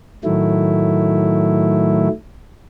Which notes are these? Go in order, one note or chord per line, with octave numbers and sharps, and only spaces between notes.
A2 D#3 F#3 A3 E4